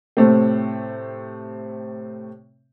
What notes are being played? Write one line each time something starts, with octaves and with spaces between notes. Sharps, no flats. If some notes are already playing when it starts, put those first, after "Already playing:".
A2 C3 A3 C4